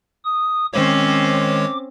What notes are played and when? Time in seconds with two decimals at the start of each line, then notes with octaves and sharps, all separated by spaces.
0.24 D#6
0.74 D#3 G#3 C4 C#4 C5 C#5 D6